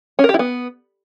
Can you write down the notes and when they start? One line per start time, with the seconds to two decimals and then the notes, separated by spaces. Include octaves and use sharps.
0.19 C#4
0.24 A#4
0.29 G4
0.34 E4
0.39 B3